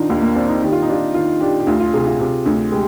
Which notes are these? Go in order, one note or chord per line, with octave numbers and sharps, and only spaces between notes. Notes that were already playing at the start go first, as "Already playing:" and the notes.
Already playing: D#3 D4 D#4 F4
D#2 A#3
A#3
C4 D4
D#4
D#3 G4
F4
D#4
D4 F4
D#3 F4
D4 G4
G4
D2 F4
F4
C3 G#4
F4
C3
D2
G#3 G4